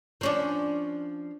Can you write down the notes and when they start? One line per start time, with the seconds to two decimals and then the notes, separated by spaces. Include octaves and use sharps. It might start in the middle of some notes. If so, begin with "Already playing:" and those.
0.21 F3 C#4 D4